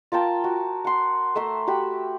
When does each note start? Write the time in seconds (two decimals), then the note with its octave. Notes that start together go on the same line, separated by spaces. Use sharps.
0.12 F4 A#4 G5 A5
0.44 F#4
0.84 F#5 C6
1.35 A3 E5 A#5 C6
1.67 F#4 G4 B5